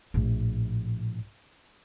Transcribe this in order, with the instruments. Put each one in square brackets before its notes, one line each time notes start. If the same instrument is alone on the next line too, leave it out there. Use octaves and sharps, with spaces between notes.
[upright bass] A#1 A2